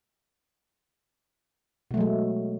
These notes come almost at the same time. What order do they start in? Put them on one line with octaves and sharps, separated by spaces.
B2 A3 F#3 G#3